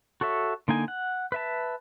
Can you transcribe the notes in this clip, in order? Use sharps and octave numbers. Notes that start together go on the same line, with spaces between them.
F#4 A4 C#5 E5
D3 A#3 D#4 G#5
F#5
B4 E5 A5